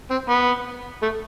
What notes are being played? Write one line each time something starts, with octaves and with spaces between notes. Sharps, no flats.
C4
B3
A3